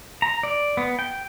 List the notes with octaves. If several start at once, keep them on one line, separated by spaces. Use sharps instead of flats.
A#5
D5
B3
G5